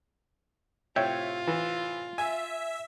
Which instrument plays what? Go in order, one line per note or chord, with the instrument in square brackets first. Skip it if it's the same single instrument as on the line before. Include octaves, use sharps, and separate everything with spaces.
[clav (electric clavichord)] A2 C3 G5 [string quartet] F4 [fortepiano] C#5 E5
[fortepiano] E3
[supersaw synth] E5 [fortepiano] G#5